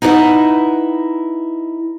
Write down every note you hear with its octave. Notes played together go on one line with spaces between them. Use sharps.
D#4 E4 B4 C#5 D#5 F#5